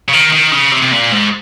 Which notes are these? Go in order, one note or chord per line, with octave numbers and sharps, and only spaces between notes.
C#3
D#3
D#3
C#3
C3
C3
A#2
G#2